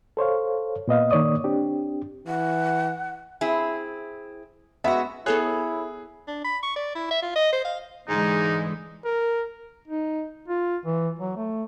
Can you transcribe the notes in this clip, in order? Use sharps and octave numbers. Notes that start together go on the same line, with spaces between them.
A4 C5 C#5 F5
A#2 B3 D#5 F5
D#3 A#3 C#5 D5 D#6
C4 D4 G4
E3 F#5
C4 E4 G#4
G#3 B3 F#4 E5
B3 E4 G#4 A4 C#5 F#6
D4
B5
C#6
D5
E4
E5
F4
D#5
C5
F5
G#2 D3 E3 G#3 D#4
A#4
D#4
F4
E3
F#3
A3